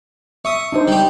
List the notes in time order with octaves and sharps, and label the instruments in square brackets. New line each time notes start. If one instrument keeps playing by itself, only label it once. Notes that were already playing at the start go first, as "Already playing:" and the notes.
[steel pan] E5 [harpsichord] C#6 D#6
[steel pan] D4 D#4 C5
[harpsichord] G3 G4